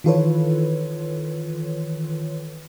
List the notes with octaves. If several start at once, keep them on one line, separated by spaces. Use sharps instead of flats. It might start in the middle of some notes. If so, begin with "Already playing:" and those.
D#3 E3 F4 A4 B4 C#5